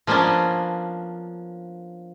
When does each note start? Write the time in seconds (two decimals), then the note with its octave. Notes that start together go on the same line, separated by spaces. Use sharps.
0.07 F3 A#3 B3 C#4 D4